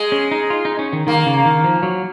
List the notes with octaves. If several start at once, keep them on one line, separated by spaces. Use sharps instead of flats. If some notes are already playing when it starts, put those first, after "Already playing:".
Already playing: G#3
C#4
D#4
F4
D#4
C#4
D#3
D#3 A#3
C#3
D#3
F3
F#3